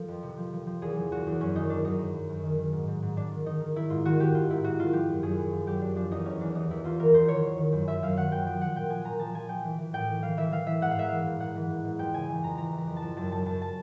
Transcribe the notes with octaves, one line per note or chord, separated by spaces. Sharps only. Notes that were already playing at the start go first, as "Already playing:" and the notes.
Already playing: F3 A4
F2
C3
F3
F3
F3
E2 G#4
F3
E2 F#4
E2
F#2 C#4
D#3 D#4
D#3 D4
F#2 D#4
F#2
F#2
F#2
D#3
D#3
G#2
G#2
G#2
G#2 D4
D#3
D#3 D#4
D#3
D#3 E4
G#2 F4
D#3 F#4
D#3 G4
G#2 F4
G#2 E4
G#2 F#4
D#3 F4
F3 G4
F#2
F#2 G#4
F#2
F3
F#2 G4
F#2 D4
F3 D4
E2 D#4
E3 C#4
E2 D4
E3 D#4
E2 E4
E2 F4
E3 A#4
E2 C5
D#3 C#5
D#3
D#3
F#2
F#2 E5
F#2 F5
D#3 F#5
F#2 G5
F3 G5
F3 F#5
A#2 G5
F3 G#5
A#2 A#5
F3 A5
F3 G#5
F3 G5
E3
E3
A2 G5
E3
E3 F5
E3 E5
E3 F5
E3 E5
G#2 F#5
F5
G#2 E5
E3 F5
G#2
G#2 F#5
E3
G#2
G#2
F2 G5
C#3 G#5
E3
F2 A#5
E3 A#5
E3
A#5
F2
A5
F2
F#2 A5
F#2 A5
F#2 A5
A5